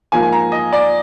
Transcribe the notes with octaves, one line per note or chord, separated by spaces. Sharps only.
G#2 F3 A#3 G#5
G#5
A#5
D#5
D5